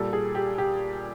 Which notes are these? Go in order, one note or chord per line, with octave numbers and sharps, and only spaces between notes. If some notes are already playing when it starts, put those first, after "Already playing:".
Already playing: A#2 G3 A4
G#4
G4
G4